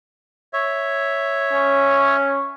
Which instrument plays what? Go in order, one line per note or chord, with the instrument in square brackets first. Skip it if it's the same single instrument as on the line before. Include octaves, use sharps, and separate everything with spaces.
[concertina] C#5 E5
[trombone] C#4